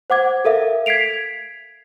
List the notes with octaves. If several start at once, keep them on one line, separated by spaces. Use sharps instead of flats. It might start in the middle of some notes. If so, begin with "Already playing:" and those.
C5 F#5 D6 G#6
A4 A#4 E5 F5
G#6 B6 C7 D7 F7